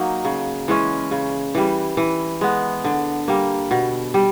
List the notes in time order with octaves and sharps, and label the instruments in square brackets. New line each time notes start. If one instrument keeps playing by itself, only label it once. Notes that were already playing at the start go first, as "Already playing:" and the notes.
Already playing: [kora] F#3 A#3 D#4
C#3
E3 G#3 C#4
C#3
E3 G3
E3
G#3 B3
D3
G3 A#3
B2
G3